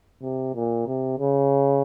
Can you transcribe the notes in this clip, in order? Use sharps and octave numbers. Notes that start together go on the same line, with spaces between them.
C3
A#2
C3
C#3